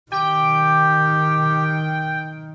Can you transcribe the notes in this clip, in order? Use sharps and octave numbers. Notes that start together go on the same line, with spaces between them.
D#3 G4 G5